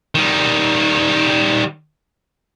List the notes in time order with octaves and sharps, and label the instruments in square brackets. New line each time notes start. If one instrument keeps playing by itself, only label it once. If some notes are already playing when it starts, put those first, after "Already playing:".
[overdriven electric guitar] D#3 G3